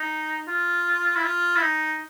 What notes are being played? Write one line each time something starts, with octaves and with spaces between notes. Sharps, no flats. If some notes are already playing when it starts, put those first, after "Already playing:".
Already playing: D#4
F4
E4
F4
E4
D#4